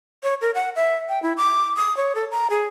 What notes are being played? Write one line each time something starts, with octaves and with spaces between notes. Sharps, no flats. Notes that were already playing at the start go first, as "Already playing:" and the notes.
C#5
A#4
F#5
E5
G5
E4
D6
D#6
C#5
A4
A#5
G#4